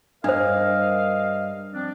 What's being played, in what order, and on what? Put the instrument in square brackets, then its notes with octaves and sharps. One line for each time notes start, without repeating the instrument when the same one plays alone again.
[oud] G2 [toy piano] D4 C5 [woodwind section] A#4 D#5 F5
[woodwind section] F3 C4 D4